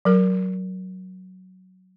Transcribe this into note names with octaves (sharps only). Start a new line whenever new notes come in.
F#3 A#4